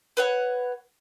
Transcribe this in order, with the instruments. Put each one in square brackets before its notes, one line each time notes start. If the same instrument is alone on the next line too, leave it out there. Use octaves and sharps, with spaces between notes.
[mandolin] B4 C#5 F#5